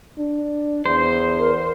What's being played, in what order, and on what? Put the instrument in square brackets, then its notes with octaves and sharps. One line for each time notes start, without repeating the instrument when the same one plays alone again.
[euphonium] D4
[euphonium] E2 [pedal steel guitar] C5
[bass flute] A#4